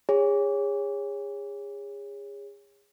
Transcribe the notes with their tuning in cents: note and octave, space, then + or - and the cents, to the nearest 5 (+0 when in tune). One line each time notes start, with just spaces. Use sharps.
G#4 -30 C#5 +0